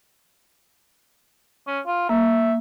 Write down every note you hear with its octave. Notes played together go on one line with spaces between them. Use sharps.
C#4
F4
A#3 E5